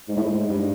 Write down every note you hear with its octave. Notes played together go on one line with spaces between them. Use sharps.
G#2
A2
G#2
G2